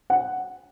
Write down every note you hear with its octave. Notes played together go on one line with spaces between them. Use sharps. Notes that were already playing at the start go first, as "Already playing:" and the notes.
F#5